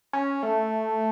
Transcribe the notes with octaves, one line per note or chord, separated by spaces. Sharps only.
C#4
A3